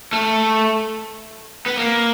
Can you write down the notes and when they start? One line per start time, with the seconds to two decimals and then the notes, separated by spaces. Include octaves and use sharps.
0.13 A3
1.66 B3
1.77 A#3